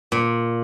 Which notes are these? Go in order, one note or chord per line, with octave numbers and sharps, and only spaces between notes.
A#2